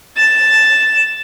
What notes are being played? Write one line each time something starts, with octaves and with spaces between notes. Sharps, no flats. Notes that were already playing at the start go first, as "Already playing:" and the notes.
A6 E7